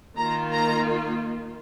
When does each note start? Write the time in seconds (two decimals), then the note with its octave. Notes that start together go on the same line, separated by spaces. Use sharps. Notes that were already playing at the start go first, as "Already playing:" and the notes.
0.17 D#3 A#3 F4 A#5
0.52 A#5